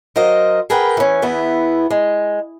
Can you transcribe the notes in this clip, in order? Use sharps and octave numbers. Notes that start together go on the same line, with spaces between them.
F#3 A#4 C5 D#5 F5
G#4 A#4 B4 F#5 G5
E3 C#4
E2 E3 B3 E4
G#3